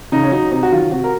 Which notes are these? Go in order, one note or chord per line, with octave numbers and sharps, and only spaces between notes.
C#3 D#4
C#4
F#3 D#4
C3 D#4
F#4
D#3 F#3 F4
C3 F#4
A#4